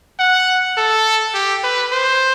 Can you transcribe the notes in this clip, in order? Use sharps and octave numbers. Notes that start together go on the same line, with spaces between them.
F#5
A4
G4
B4
C5